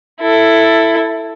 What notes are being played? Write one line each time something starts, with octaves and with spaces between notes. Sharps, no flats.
E4 A4